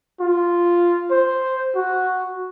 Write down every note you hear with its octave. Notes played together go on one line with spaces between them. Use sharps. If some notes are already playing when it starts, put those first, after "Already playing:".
F4
C5
F#4